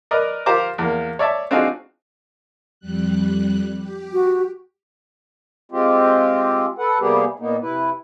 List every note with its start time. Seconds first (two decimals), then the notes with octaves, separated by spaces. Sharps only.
0.11 A#4 B4 D5 D#5
0.46 F4 G4 A#4 C5 A#5 D6
0.78 E2 A#3
1.19 C#5 D5 E5 A5
1.51 C4 D4 D#4 F4 F#4 G#4
2.80 F2 G3 F#6
3.79 G4
4.13 F#4
5.72 G#3 C4 F4 G4
6.78 A4 B4 F#5
7.00 C3 G3 A#3 B3 G4 G#4
7.39 A#2 A#3 B3 D#4
7.61 C3 E4 B4